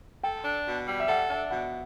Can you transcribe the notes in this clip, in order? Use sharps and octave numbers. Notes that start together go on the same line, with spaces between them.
A4 G5
D4
B2
G3
E5
A4 F#5
D4 E5
B2 F#5